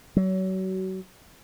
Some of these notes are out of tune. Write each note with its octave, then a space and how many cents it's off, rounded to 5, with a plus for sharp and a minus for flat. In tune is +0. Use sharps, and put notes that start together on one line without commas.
F#3 +30